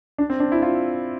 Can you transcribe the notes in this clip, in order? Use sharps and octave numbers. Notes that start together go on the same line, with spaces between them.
D4
C4
D4
E4
F4